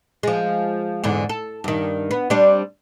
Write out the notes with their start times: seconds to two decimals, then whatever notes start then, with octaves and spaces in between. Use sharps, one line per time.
0.23 F3 G#3
1.04 E2 G#2 D3
1.29 A4
1.64 G2 D#3
2.11 B3
2.30 G3 C4 D4